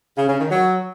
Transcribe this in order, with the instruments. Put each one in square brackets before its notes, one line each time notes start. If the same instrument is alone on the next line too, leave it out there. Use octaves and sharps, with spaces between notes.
[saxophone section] C#3
C#3
D#3
F#3